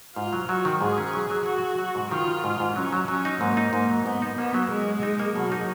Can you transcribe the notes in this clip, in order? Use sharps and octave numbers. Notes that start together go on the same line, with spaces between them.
G#2 F4
F#3
F#3 F#4
D#3
G#2 G#4
C#4
F#3
F#3
F#3 F#4
F#3
F#3
G#2
D#3 F4
D#3
G#2
G#2
F#3 C#4
F#3
F#3 C#4
D#4
G#2 A#3
D#4
G#2 A#3
F#3
G#2 B3
D#4
A#3 B3
F#3
G#3 D#4
F#3
D#4
A#3
B2 F#3
D#4